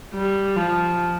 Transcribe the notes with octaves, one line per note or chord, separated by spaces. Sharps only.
G3
F3